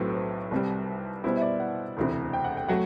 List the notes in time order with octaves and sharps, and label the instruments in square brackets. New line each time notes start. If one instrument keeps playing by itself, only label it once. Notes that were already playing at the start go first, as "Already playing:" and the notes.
Already playing: [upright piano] B1 A2 F#3 C4 [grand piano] A4 B4
[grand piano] C5
B4
[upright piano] C2 C3 G3
[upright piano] B2 G3 B3 E4 [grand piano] C5
[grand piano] E5
D5
F#5
[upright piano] E1 D2 C3 E3
[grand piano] G5
F#5
G5
[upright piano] F#3 A3 [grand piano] F#5